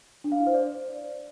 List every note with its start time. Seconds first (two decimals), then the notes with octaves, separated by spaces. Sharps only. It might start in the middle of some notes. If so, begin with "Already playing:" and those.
0.24 D4
0.32 F5
0.39 E4
0.47 C5
0.54 D5